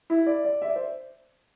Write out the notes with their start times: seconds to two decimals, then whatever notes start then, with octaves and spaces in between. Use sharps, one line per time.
0.10 E4
0.27 D5
0.45 D5
0.62 E5
0.68 D5
0.76 C5